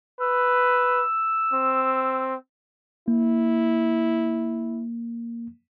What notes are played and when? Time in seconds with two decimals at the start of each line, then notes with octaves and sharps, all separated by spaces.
0.21 B4 E6
1.54 C4
3.08 A#3 E4